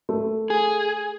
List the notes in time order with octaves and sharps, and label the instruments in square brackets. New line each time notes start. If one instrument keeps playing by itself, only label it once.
[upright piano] A3
[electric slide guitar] G#4